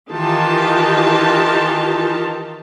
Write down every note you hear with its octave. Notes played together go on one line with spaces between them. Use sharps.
D#3 E3 D#4 F4 G4 A5